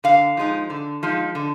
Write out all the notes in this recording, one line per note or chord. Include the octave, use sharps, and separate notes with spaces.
D3 F5
F3 G#3 D#4
D3
F3 G#3 D#4
D3